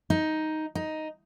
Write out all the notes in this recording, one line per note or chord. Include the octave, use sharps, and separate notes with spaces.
D#4
D#4